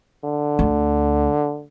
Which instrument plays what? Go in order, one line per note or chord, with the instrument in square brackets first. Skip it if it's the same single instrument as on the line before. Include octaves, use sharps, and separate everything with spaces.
[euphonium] D3
[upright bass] D2